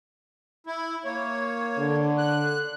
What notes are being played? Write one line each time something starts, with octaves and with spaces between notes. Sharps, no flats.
E4
A#3 C#5
D3
F#6